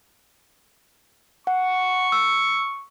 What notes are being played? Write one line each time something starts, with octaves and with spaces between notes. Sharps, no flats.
F#5 C#6
E6